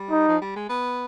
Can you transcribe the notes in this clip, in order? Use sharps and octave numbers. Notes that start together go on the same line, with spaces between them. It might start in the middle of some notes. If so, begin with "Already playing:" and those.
Already playing: G3
D#4
F3
G3
G#3
B3